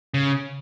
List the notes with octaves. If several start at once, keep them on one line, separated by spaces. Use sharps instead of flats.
C#3